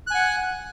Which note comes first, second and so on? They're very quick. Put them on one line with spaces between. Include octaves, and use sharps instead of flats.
F#6 G#5 F#5